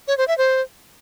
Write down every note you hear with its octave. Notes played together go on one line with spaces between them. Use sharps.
C#5
C5
E5
C5